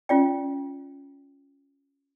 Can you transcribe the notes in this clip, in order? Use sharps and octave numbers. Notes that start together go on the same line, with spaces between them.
C#4 F4 D5 G5